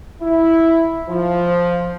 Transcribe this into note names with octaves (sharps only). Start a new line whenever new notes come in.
E4
F3